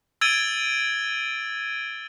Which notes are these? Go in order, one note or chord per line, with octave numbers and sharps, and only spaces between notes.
E6 G#6 A6 D7 D#7 G7